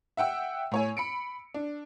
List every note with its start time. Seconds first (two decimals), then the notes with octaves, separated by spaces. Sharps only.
0.17 E5 F#5 G5 E6
0.72 A2 C#5 G#5
0.97 B5 C#7 D7
1.54 D4